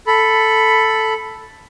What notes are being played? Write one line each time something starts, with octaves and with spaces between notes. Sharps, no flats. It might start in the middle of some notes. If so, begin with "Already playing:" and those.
A4 B5